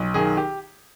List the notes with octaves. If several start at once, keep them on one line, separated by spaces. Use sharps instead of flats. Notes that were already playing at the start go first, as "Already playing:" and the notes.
Already playing: B1
D#3 G#4
G4